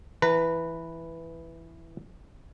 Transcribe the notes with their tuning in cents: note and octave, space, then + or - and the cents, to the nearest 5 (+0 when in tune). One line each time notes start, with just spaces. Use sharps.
E3 +0 B4 +0 A#5 -30